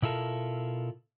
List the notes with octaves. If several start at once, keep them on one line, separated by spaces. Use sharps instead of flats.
B2 E4 F4 A4 A#4